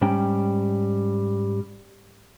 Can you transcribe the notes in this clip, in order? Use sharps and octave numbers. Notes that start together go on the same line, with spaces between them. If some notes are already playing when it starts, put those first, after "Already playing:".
G#2 G3 C#4 G5